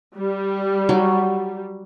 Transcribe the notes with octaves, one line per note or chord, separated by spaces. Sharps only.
G3
F#3